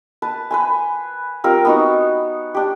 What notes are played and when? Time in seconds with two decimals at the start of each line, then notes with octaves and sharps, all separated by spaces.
0.22 B4 A5
0.51 B4 C5 G#5
1.44 G3 C4 F4 A#4
1.65 B3 D#4 F#4
2.54 D4 G4